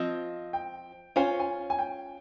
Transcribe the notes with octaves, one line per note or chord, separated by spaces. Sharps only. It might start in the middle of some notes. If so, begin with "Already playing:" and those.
Already playing: F3 C4 F4 D#5
G5
C#4 F4 C5 G#5
G#5
G#5
G5